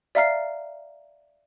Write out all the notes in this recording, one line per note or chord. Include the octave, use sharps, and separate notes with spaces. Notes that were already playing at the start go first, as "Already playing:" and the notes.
D5 E5 F5 A#5 F6 C7